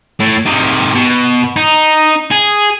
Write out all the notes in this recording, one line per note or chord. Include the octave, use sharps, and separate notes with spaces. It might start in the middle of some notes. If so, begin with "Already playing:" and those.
A2
C3 D#3
B2
D#4
G#4